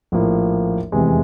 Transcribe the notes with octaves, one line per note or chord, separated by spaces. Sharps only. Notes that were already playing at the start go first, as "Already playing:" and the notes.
A#1 A2 F3 A#3
F1 E2 C3 E3 G#3